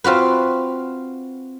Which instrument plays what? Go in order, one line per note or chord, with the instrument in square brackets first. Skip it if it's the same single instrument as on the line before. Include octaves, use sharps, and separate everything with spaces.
[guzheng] C4 F4 F#4 B4